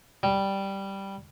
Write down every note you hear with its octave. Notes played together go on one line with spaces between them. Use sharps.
G3